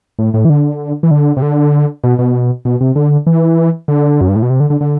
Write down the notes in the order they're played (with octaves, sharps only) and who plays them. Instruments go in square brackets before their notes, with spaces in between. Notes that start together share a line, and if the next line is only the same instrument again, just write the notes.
[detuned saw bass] A2
A2
E3
D3
E3
D3
C3
D3
B2
B2
B2
C3
D3
E3
D3
F#2
G2
A2
B2
C3
D3
D3
D3